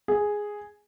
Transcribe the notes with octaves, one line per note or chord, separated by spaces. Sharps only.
G#4